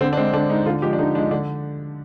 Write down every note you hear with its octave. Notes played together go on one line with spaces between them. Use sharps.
D3 C4
D4
G#3 C4
D3 D4
G#3 D#4
D3 F4
F3 G#3 G4
D4
D3 D#4
F3 G#3 D4
D3 D4